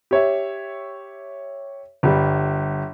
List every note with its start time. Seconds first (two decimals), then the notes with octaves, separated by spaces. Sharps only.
0.11 G4 C#5 E5
2.03 G1 G3